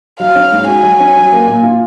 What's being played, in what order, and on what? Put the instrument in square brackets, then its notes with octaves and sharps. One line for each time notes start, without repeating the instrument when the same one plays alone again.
[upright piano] F#3 [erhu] F5
[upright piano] C#4
G#2
[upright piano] F#4 [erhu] G#5
[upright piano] F#3
C#4
F#3
A#3
A#2
F4